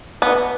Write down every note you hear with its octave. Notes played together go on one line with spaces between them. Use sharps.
B3